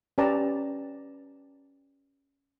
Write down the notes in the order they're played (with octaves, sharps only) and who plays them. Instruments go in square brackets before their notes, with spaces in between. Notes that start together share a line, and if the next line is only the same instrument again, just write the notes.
[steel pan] C#4 G4 B4 D5 A5 A#5